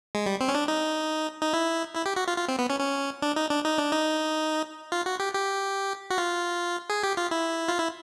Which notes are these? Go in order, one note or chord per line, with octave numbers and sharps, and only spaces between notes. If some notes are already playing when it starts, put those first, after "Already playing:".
G#3
G3
C4
C#4
D4
D#4
D#4
E4
E4
G4
F#4
F4
F4
C4
B3
C#4
C#4
D4
D#4
D4
D#4
D4
D#4
F4
F#4
G4
G4
F#4
F4
G#4
G4
F4
E4
F4
E4